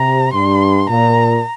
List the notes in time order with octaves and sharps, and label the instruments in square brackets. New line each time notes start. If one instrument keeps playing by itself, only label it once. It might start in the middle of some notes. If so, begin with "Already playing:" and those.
Already playing: [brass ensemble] C3 [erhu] A#5
[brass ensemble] G2 [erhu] C6
[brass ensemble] A#2 [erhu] A#5